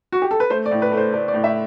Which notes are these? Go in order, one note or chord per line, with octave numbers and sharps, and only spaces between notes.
F#4
G4
A4
B4
A3 C5
D5
A2
B4
A3
C5
A3 D5
D5
A2
E5